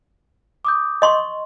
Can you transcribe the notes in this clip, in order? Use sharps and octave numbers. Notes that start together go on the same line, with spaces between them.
D6 D#6 G6
D#5 C6 C#6